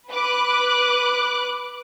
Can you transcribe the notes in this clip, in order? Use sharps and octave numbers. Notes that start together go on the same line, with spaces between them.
B4 D6 F#6